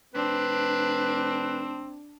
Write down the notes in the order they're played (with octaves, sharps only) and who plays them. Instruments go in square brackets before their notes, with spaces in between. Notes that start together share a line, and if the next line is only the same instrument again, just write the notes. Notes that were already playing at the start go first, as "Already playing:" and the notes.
[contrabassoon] F1 [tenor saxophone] C4 [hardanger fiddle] D4 [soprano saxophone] B4